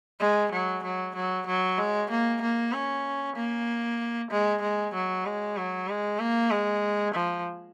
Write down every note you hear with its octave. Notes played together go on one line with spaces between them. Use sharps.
G#3
F#3
F#3
F#3
F#3
G#3
A#3
A#3
C#4
A#3
G#3
G#3
F#3
G#3
F#3
G#3
A#3
G#3
F3